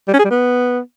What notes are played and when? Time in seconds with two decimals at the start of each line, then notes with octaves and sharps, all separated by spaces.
0.08 G3
0.13 C#4
0.19 G#4
0.25 G3
0.30 B3